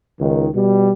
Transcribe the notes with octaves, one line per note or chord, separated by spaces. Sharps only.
C#2 D#3
B2 G3